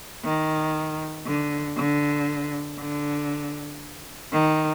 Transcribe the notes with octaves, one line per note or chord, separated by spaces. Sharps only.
D#3
D3
D3
D3
D#3